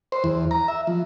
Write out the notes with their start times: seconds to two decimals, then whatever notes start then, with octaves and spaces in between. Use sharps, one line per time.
0.12 C5
0.24 E2
0.51 A#5
0.68 E5
0.87 F3